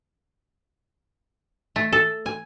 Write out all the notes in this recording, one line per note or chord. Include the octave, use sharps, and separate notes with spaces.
A3
A4
G#5